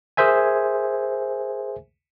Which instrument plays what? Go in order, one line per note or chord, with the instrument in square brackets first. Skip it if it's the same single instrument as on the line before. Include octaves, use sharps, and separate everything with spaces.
[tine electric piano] G#4 A#4 C5 E5 G#5